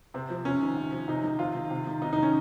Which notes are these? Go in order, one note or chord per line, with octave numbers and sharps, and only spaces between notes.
C3 C4
F3
C3 C#4
D#3
C3
F3
C3 D#4
D#3
C3 F4
D#3
C3
D#3
C3 D#4
D#4
D#3 C#4